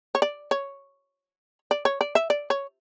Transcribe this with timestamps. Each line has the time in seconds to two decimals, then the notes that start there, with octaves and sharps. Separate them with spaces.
0.15 C#5
0.22 D5
0.51 C#5
1.71 D5
1.85 C#5
2.01 D5
2.15 E5
2.30 D5
2.50 C#5